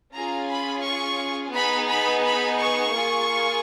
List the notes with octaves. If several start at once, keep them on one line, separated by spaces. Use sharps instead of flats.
C#4 F4 G#4 A#5
B5
C#6
B3 D#4 G#4 B5
B5
B5
C#6
A#3 F4 G#4